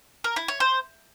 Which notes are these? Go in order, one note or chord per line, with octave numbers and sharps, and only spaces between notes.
A#4
E4
C#5
C5